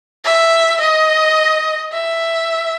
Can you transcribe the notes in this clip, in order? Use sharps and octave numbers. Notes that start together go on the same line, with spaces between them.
E5
D#5
E5